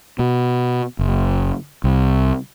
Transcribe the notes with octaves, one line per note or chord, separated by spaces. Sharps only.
B2
F#1
C2